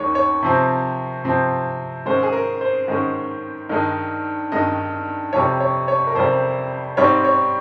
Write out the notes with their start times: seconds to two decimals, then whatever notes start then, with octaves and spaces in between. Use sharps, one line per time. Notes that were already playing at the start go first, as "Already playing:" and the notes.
Already playing: D#2 D#3 G#3 D#4 C#5
0.15 C#5
0.43 C3 F3 C4
1.24 C3 F3 C4
2.06 G#2 D#3 G#3 C#4 C5
2.23 G#4
2.33 A#4
2.61 C5
2.88 G#2 D#3 G#3 C#4
3.69 G2 D#3 G#3 D#4
4.52 G2 D#3 G#3 D#4 D#5
5.33 F2 C3 G3 C#5
5.60 C#5
5.88 C#5
6.07 A#4
6.15 F2 C3 G3 C5
6.97 G#2 G3 C4 D#4 C#5
7.24 C#5